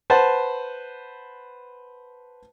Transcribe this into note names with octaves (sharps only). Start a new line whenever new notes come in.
B4 C5 F#5 A5